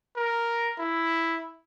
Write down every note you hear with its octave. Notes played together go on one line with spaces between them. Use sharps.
A#4
E4